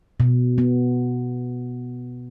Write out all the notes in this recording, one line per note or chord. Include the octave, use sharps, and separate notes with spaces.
B2
B3